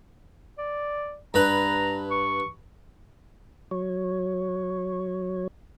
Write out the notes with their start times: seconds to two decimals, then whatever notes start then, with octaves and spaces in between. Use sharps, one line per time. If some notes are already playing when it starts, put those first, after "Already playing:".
0.58 D5
1.34 G2 B4 A#5
2.11 C#6
3.71 F#3 C#5